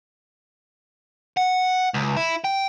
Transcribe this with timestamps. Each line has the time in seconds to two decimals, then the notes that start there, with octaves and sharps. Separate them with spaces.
1.37 F#5
1.94 C#2
2.17 E4
2.44 G5